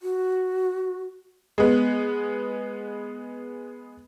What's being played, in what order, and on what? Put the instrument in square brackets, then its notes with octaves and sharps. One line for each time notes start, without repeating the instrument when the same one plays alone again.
[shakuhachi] F#4
[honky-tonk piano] G#3 B3